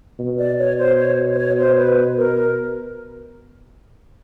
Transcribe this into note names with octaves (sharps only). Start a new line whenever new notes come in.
B2
D5
C#5
C5
C#5
C5
C#5
C5
B4
A#4